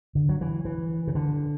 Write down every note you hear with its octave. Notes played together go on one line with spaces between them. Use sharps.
D3
F#3
E3
E3
C#3
D3